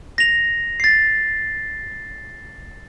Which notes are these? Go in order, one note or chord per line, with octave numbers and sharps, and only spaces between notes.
A#6 F7
A6 C7